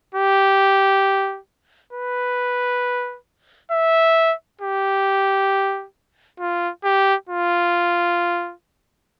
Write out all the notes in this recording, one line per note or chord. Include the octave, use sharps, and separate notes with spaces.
G4
B4
E5
G4
F4
G4
F4